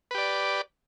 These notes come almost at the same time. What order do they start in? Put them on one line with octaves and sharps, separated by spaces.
B4 G4 D5